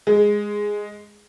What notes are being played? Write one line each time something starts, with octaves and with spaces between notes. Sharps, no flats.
G#3